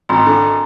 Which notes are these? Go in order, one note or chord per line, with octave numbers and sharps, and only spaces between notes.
G#1 A#5 C6
D3